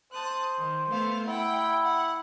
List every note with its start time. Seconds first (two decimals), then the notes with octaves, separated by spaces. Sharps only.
0.12 C5 A5 D#6 F#6
0.58 D#3
0.90 A3 B3 F5
1.27 E4 F#5 G5
1.83 F#5